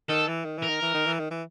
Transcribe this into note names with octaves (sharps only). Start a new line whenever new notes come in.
D#3 A4
E3
D#3
E3 A#4
D#3
E3
D#3
E3
D#3
E3